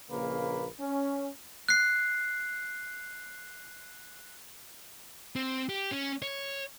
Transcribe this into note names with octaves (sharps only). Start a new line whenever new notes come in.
A#1 C#3 A#3 A#4 B4
C#4
F#6 C7
C4
G4
C#4
C#5